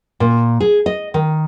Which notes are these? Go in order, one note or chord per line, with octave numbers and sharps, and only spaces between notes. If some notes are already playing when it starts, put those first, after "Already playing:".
A#2
G#4
D#5
D#3